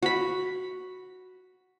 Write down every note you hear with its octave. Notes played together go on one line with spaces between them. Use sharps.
F#4 B5